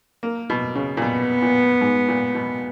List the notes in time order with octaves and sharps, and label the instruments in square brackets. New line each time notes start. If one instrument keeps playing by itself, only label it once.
[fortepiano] A#3
B2
C#3
A#2
[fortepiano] B2 [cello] B3
[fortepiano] A#2
G#2
A#2
B2